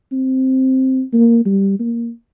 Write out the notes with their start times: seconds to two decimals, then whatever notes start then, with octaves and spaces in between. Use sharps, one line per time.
0.12 C4
1.13 A#3
1.46 G3
1.79 A#3